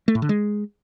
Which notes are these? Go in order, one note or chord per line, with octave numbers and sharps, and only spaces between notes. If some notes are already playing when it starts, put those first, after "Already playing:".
A3
A2
D3
G#3